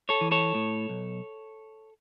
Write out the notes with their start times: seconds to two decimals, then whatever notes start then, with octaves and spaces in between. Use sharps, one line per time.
0.09 A4 C#5
0.21 E3
0.31 A4 C#5
0.55 A2
0.89 B1